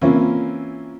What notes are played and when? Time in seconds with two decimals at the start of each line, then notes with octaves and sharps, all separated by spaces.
0.02 E3 A#3 C4 C#4 E4 F4